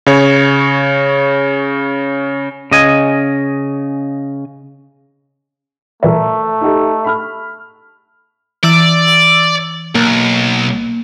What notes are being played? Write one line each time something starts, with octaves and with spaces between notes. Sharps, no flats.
C#3 C#5
C#3 D#5 G#5
A#2 E3 G3 A3 A#4 E5
D#4 G4 A4
B5 F6
E3 D5 E6
B1 A#3